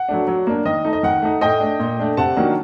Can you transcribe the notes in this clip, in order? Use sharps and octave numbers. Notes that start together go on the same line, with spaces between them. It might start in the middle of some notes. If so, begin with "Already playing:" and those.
Already playing: F#5
F#3 A3 D4
F#3
A#3 D4
D#3 D#5
A3 D#4
D#5
D#3 F#5
A3 D#4
A2 D#5 G5
A3 D4
A#2
A3 D4
C3 F#5 A5
D#3 F#3 A#3 D4